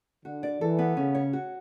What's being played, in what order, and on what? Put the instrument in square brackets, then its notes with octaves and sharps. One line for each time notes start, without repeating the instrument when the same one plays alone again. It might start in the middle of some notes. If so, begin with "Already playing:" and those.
[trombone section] D3 [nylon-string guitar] F#4
[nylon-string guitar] D5
[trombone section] E3 [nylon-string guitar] A4
[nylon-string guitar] B3
[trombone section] C#3 [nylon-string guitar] C#4
[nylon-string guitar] C#5
F#4